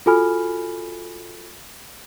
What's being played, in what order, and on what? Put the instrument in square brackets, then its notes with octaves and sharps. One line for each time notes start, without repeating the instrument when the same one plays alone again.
[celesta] F4 F#4 A4 G#5 B5 F6